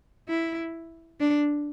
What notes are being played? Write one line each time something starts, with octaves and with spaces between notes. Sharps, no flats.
E4
D4